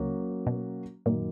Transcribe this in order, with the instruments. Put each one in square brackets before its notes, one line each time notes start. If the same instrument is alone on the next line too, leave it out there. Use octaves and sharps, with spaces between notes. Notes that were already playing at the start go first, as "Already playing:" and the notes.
Already playing: [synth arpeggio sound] C#2 C#3 [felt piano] F#3 A#3 C#4 F#4 C#5
[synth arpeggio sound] B2
[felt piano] F#2 D#3 A#3 [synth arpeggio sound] A#2